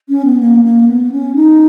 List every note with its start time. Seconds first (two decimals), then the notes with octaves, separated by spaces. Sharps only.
0.09 C#4
0.25 B3
0.40 A#3
0.65 A#3
0.88 B3
1.12 C#4
1.35 D#4